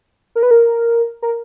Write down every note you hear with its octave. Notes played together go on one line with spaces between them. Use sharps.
A#4
B4
A#4
A#4